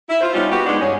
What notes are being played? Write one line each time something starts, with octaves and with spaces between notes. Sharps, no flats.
E4
F4 C5
G3 B3 C#4 D#4 F4 F5
B3 F#4 G4
G#3 B3 D4 D#4
G2 F3 G#3 C#4 G#4